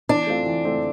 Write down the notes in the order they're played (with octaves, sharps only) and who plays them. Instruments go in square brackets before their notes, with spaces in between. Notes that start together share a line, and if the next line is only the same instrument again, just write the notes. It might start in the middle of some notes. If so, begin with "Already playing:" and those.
[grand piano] E3 [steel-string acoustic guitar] D4
[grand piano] A3 C4 F4
E3
A3 C4 F4